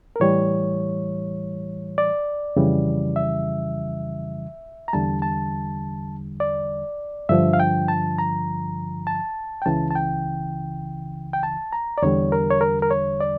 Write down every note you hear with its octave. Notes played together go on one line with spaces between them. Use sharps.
A#4
A2 E3 G3 C#5
D5
F2 C#3 E3 G3
E5
A#5
E2 D3 G3 A5
A5
D5
G2 D3 F3 E5
F5
G5
A5
A#5
A5
G5
C#2 C#3 E3 A5
A5
G5
G5
A5
A#5
D5
E2 D3 G3 C#5
A#4
C#5
A#4
A#4
C#5
D5